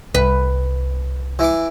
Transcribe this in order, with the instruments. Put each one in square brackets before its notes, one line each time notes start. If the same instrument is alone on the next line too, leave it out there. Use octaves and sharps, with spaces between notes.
[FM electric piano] C2 [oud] B4
[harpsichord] E3 D6